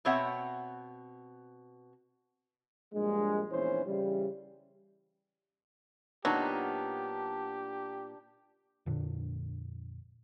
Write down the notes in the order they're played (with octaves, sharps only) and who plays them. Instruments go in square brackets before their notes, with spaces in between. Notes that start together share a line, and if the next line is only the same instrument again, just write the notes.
[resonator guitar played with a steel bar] B2 C4 C#5 E5 F#5
[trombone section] A#1 G2 G#3
A#1 E2 E3 C#4 C5
C#3 E3 G3
[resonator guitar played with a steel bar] A#2 B3 D#4 [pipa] F#3 [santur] D4 [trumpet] G4
[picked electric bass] F2 A#2 D3